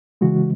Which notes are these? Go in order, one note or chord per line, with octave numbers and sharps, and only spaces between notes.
C#3 E3 G#3 F#4